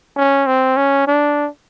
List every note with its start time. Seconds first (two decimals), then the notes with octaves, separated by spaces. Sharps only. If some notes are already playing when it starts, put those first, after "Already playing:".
0.16 C#4
0.47 C4
0.77 C#4
1.08 D4